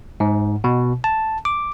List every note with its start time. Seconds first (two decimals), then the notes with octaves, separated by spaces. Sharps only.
0.20 G#2
0.64 B2
1.04 A5
1.45 D6